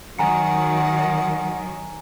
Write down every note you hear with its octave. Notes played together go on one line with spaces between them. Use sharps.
D#3 F#3 F#5 G#5 A#5 C#7